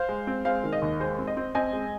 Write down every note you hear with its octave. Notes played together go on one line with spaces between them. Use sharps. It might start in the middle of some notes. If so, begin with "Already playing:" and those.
Already playing: C5 F5
G#3
C4
G#3 C5 F5
D#3
D#5
D#2
G#3 C5
C4
D#5
C4
C4 D#5 G#5
G#3